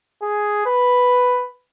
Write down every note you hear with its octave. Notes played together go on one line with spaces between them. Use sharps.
G#4
B4